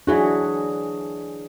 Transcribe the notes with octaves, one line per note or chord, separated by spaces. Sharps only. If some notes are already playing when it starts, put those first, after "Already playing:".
E3 F#3 D4 F#4 G#4